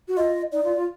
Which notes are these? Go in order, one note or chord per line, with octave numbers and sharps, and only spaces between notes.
F#4
F4 D#5
D#4 D5
F4
F4